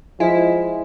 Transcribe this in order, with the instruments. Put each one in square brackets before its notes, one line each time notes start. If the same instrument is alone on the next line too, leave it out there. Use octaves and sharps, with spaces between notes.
[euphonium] F3 [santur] G#3 F5 [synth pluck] E4